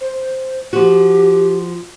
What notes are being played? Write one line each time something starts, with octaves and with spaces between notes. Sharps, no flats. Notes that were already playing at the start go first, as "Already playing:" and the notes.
C5
F3 F#4 G4